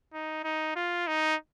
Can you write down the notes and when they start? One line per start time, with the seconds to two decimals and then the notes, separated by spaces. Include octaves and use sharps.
0.14 D#4
0.44 D#4
0.76 F4
1.07 D#4